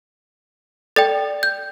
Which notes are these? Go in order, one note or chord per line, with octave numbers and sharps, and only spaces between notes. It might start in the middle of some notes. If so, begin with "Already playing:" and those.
A4 D5 G5 A6
G6